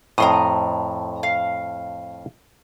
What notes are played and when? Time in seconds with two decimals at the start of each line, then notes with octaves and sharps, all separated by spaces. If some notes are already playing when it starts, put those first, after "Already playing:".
0.18 F2 A2 A#5 C6 D#6
1.23 F5